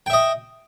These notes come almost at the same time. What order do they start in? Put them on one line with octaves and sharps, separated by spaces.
G5 E5 D#5